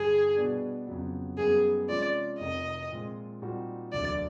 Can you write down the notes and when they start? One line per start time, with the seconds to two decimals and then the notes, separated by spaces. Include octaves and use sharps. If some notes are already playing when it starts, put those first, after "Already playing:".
Already playing: G2 D3 G3 G#4
0.36 B2 G3 B3 D4
0.87 F2 C#3 F#3 B3
1.38 F#2 D#3 G3 B3 G#4
1.89 C3 F3 G#3 C#4 F4 D5
2.39 F1 F2 C3 D#3 D#5
2.91 A#2 F3 G#3 C4
3.42 A#2 G3 C4 D#4 F#4
3.93 E1 D2 D3 F#3 D5